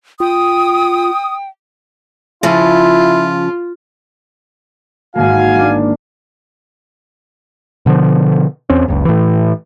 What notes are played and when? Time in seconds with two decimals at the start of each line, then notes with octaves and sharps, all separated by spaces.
0.20 F4 G5 D#6
2.43 C#3 F3 E4 F4
5.15 G#1 A#3 F#4 F5 G#5
5.56 A#3 D4
7.86 B2 D3 E3 F3
8.70 E2 C4 C#4
8.88 F#1 C#2
9.05 A2 E3